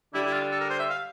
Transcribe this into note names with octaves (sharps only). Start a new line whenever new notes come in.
D3 G3 D4 E4
E4
F4
A4
A#4
C5
E5
F5